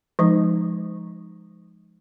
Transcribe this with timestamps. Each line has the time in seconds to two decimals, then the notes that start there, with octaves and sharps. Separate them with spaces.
0.19 F3 G#3 D#4